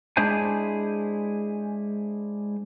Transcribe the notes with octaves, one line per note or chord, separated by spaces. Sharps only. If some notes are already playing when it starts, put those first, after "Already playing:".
G#3 D4 E4 G#4 C5 G#5